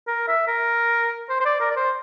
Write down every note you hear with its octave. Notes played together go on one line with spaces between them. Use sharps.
A#4
E5
A#4
C5
C5
D5
A#4
D5
C5